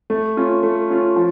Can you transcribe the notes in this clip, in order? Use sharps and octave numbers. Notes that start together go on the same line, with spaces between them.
A3
C#4 F4
A3
C#4 F4
F3